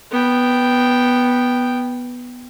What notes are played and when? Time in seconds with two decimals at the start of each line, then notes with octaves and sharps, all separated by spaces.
0.11 B3 G5